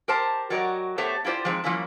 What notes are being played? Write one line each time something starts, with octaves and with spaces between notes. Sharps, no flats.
G4 A#4 C5 A5
F#3 F#4 G4 A#4 D5 D#5
A3 B3 G4 C5 C#5
E4 F4 G4 C5 D5
F3 G#3 C4 D#4
F3 G3 A#3 C#4 E4